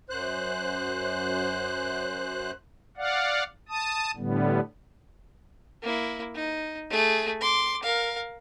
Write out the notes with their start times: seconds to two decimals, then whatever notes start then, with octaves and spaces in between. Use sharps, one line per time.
0.10 F#2 C5 F#6
2.97 D5 F5 F#5
3.69 A5 D#6
4.17 A2 D3 G3 B3
5.82 A#3 E4
6.34 D#4
6.90 A3 G#4
7.41 C6 D6
7.82 A#4 F5